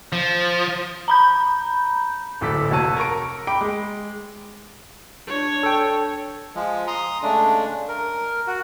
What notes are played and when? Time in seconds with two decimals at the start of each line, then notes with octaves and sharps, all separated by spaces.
0.13 F3
1.08 A#5 B5 G6
2.41 D1 A#1 A4 D6 B6
2.71 F1 F#4 C#5 A5 E6 D#7
2.97 A#4 A#5 C#6 D7
3.47 G5 B5 D6 D7
3.61 G#3
5.28 D4 C#5
5.63 A4 G5
6.55 F3 G#3
6.87 A#5 C6 D#6
7.22 C#3 G#3 A3 D4
7.88 A#4
8.47 F#4